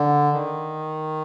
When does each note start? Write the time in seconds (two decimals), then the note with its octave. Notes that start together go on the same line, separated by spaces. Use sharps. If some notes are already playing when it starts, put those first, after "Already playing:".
Already playing: D3
0.33 D#3